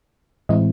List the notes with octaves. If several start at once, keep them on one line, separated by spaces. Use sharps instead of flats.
A2 E3 G#3 C4 E4 D#5